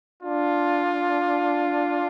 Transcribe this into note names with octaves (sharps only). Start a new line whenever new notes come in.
D4 F4